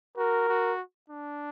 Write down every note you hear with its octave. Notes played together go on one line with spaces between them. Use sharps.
F#4 A#4
F#4
D4